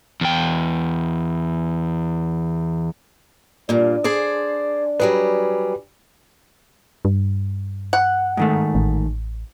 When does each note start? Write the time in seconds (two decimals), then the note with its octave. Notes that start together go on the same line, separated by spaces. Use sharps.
0.21 E2 G5
3.69 G2 A#2 D4
4.04 G#4 C5 D5
5.00 F#3 G3 G4 G#4 B4
7.05 G2
7.93 F#5
8.37 G#2 D#3 A3
8.75 A1